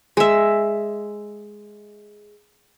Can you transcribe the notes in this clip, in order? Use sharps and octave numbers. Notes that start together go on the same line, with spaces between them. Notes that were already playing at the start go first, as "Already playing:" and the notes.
G#3 E5